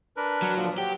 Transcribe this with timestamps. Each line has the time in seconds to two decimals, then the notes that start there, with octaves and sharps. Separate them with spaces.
0.17 D4 A#4 B4
0.42 F#3
0.56 A#2 D3 F3
0.78 F#3 G4